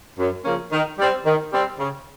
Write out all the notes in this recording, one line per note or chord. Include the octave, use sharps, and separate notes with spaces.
F#2
C#3 F3 A#3 C#4
D#3
G3 C4
D#3
G3 C4
C#3